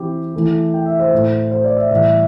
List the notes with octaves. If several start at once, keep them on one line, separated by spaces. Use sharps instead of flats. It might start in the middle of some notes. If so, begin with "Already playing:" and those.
Already playing: E3 C4 E4 G4
E3 A3 E4
G5
E5
C5
A2 A3 E4
C5
D5
E5
A2 E3 G3 E5